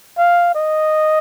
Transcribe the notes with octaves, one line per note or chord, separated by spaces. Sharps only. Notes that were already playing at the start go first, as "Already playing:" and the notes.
F5
D#5